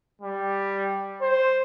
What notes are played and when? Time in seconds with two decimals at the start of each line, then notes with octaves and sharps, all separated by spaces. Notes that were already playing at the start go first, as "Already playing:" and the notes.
0.22 G3
1.21 C5